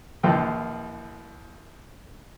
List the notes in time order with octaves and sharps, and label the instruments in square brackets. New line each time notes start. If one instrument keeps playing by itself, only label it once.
[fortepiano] A#1 D#2 E3 F3 F4 G5